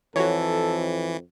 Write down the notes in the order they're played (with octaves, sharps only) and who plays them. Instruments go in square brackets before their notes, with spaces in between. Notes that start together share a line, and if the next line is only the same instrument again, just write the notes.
[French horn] F2 [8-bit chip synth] E3 [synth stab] F#4 C#5 [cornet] A4